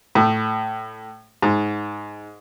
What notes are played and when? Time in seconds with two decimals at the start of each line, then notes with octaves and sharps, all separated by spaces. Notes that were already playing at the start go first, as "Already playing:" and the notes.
0.15 A2
1.42 G#2